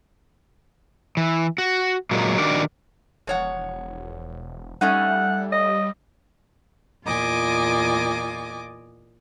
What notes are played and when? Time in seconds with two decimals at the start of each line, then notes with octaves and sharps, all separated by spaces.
1.17 E3
1.58 F#4
2.11 A#2 F#3 G#3 A#3
2.38 D#3 D4 F#4 G4 A#4 D5
3.27 E1 F3 C#5 F#5
4.81 G3 A3 C#4 D#4 F#5
5.52 D#5
7.04 E2 A#2 F4 D#5 G#5 D6